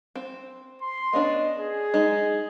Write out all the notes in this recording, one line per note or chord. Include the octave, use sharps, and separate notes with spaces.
C4
C6
B3 C#4 D4 D#5
G#4
G#3 D#4